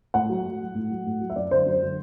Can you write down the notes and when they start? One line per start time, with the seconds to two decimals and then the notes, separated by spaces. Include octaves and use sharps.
0.14 A2 F#5
0.29 F#3
0.45 A2
0.61 F#3
0.75 A2
0.91 F#3
1.06 A2
1.21 F#3
1.30 E5
1.36 F#2 D5
1.51 D3 F#3 C5
1.66 F#2
1.82 D3 F#3